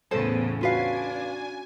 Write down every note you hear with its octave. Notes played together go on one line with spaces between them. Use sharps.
E2 A2 C#3 B3 A4 C5
C#4 D4 F4 F#4 B4 F5 G#5